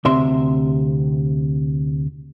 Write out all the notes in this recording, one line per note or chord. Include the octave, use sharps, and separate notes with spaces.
D2 C3 E5 C6